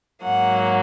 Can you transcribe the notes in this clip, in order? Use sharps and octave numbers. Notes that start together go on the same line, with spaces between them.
G#2 F#3 A#3 F#5